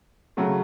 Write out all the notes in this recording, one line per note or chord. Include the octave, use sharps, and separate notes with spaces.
C#3 F#3 A3